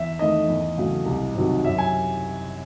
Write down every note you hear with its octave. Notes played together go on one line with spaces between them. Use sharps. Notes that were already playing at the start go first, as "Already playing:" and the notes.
Already playing: E2 E5
D#3 A3 D#5
E2
C#3 F#3 A3
C2
C3 D#3 F#3
F#2 E5
G#5